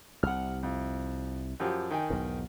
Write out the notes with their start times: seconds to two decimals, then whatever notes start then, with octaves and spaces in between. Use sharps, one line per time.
0.23 C2 C3 F#5 F6
0.63 F2
1.60 F#2 F3 G4
1.91 D#3 G5 G#5
2.10 B1 E2 G#2